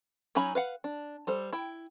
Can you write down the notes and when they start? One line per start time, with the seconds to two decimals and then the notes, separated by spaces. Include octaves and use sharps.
0.35 F#3 C#4 D#4 G#5 B5
0.55 B4 F5 F#5
0.84 D4
1.27 G3 A4 C5
1.53 E4 G5